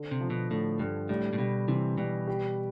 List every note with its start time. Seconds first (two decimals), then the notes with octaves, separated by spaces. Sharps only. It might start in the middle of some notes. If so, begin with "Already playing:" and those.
Already playing: D3
0.11 C3
0.21 F3
0.30 B2
0.50 A2 D3
0.79 G2 D3
1.09 A2 G3
1.33 A2
1.38 B2 G3
1.68 C3 E3
1.98 B2 G3
2.27 G4